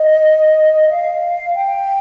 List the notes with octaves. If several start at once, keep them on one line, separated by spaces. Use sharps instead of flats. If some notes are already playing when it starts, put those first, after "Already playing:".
Already playing: D#5
F5
G5